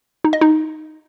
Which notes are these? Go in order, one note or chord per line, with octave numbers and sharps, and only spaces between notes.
D#4
D#5
D#4